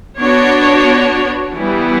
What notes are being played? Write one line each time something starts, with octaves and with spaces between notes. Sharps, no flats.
B3 D4 F#4 C#5
E3 G3 B3